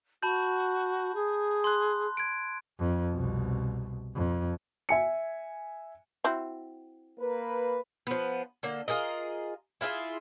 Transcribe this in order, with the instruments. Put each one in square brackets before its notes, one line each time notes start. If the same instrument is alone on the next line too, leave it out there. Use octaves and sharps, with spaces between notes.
[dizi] F#4 [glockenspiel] A5 B5 G6
[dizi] G#4
[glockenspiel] C6 F#6
G#6 D7
[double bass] F2
C2 B2
F2
[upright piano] E5 G#5 C#7
[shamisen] C4 E4 F#4
[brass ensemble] A#3 B4
[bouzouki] F3 B3
D3 A#3
F4 G#4 A#4 D#5
E4 F4 G#4 E5